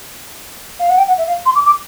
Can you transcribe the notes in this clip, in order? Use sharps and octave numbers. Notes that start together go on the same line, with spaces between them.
F5
F#5
G5
F#5
E5
F5
C6
D6
D6